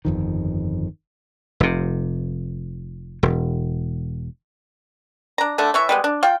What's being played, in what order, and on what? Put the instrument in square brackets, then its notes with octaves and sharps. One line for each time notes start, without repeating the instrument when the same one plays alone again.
[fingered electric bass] G1 F2 D#3
[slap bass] F1 C3
E1
[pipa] D4 A#5
D3 A3 D4
E3 C#5 E5
G3 G#3 B3
D4
F4 G5